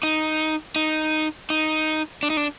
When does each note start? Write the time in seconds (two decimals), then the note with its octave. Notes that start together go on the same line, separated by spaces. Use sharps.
0.03 D#4
0.76 D#4
1.50 D#4
2.23 D4
2.30 D#4
2.37 D4